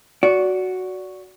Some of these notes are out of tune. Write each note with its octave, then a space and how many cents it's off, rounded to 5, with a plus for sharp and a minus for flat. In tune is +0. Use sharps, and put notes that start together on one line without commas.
F#4 +0 D5 -25